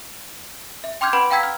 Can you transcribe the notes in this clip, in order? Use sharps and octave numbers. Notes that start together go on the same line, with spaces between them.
E5
G5 C6 D6 F6 G6 G#6
B4 F#5 B5 D7
F5 G5 A#5 E6 G#6 B6
F6